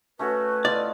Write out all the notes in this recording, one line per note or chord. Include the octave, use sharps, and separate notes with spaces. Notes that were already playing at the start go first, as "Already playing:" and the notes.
A3 C#4 F#4 B4
E4 F4 D5 D#5